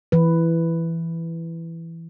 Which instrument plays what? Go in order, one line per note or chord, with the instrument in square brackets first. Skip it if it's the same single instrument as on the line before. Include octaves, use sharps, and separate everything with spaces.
[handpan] E3 B4